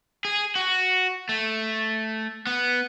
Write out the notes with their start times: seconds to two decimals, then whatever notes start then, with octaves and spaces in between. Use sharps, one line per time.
0.25 G#4
0.55 F#4
1.29 A3
2.47 B3